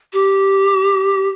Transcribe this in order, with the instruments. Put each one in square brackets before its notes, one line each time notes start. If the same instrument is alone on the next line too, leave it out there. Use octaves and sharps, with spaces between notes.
[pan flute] G4